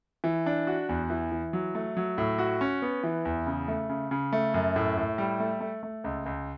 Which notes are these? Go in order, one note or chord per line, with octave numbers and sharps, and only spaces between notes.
E3
D4
F#4
E2
E3
E3
F#3
A3
F#3
A2
F#4
C#4
B3
E3
E2
C#3
A3
C#3
C#3
A3
F#2
A2
A2
G3
A3
A3
A3
C#2
C#2